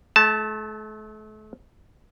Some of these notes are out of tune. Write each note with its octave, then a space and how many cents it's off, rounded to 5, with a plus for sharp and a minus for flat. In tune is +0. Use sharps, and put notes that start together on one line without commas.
A3 -40 A5 +0